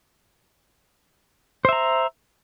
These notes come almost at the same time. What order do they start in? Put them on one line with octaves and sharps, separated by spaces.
C5 E5 A#5